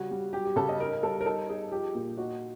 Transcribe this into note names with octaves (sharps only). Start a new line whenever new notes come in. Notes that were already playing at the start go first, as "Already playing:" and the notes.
Already playing: C#3 G3 F#4
G3
F#3 G4
G4
C#3 A4
D#5
D#4 A#4
G3 A4
A#4
D#4 A4
D#4 G#4
F3 G4
A#2
D#4 F#4